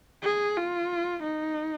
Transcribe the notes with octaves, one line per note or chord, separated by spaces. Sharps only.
G#4
F4
D#4